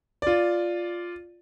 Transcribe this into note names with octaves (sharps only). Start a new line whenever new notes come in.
F4 D5